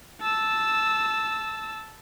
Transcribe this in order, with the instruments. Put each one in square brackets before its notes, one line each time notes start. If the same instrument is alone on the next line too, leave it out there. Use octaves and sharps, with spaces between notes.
[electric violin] A5 E6